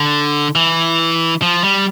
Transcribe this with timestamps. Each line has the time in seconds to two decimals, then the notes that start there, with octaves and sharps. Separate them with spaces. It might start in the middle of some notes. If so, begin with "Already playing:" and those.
Already playing: D3
0.55 E3
1.42 F3
1.64 G3